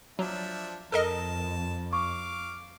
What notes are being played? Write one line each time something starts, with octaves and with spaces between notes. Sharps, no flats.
F3 F#3 D4 E5
F2 A4 A#4 D#5 A5
F5 C#6 D6